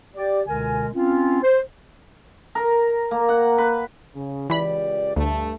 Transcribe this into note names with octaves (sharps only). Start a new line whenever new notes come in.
G4 D5
C#2 B2 D3 G#3 A#4 G#5
C4 C#4 F4
C5
A#4
A#3
F#5
B4
C#3
C#2 E3 G4 D5 B5
D2 G2 A3